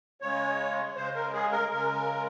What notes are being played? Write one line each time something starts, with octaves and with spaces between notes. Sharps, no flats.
C#3 G#3 C#5
C#3 G#3 C5
A#4
G#4
A#4
C#3 G#3 A#4